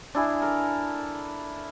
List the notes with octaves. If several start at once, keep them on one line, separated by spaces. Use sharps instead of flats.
D4 E4 G#4
A4 A#4